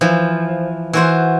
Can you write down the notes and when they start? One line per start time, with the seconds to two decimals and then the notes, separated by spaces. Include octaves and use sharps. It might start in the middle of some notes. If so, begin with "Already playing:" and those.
0.01 E3 F3
0.93 E3 F#4 C5